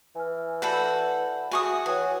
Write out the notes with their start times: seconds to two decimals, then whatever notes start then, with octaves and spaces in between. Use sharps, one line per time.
0.15 E3 G#5 F6
0.62 F#4 A4 D5 F#5 B5 G6
1.51 F#4 G#4 E5 G#5 C#6 D#6
1.86 E3 B4 C#5 G5 G#5